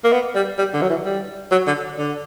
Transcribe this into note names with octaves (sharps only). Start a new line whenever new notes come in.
A#3
B3
G3
G3
D3
F#3
E3
G3
F#3
D3
D3